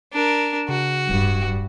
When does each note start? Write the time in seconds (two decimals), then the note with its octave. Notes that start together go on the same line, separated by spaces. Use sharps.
0.13 D4 A#4
0.69 C#3 F#4
1.10 D1 G2